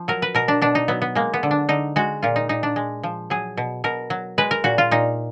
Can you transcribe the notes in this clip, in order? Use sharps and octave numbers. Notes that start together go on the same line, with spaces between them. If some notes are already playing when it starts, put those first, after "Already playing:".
Already playing: F3
F#3 A#4
B4
B2 A#4
D4
B2 D4
D#4
F#3 B3
B3
G#3 A#3
B3
D3
D4
D3 D#4
G#3 F#4
A#2 F4
D#4
A#2 D#4
D4
G#3
F3
F#3 G#4
B2
B2 A#4
F#3
G#3 B4
A#4
A#2 F#4
F4
A#2 D#4